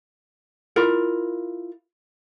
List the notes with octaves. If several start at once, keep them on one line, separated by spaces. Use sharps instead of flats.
E4 F4 A#4